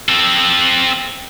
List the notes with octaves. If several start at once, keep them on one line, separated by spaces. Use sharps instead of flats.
C4 A4